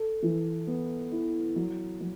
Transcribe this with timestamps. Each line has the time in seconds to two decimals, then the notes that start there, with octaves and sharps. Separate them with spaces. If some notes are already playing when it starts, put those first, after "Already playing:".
Already playing: A4
0.23 E3
0.67 B3
1.12 E4
1.56 F#3
2.00 F#3